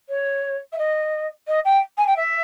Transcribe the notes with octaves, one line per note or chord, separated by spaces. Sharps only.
C#5
E5
D#5
D#5
G5
G#5
G5
E5